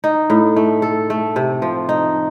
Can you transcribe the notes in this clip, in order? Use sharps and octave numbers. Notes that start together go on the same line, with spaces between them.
D#4
A2
A3
A4
A3
C3
F3
D#4